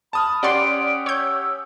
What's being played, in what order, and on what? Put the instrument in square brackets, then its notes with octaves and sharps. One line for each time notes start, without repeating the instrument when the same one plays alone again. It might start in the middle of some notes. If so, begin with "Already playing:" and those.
[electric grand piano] A5 D#6 F6 [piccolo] B5
[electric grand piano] C#4 G4 F#5 [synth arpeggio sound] D5 C6 [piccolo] D7
[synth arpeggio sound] C#5 G6 [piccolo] E6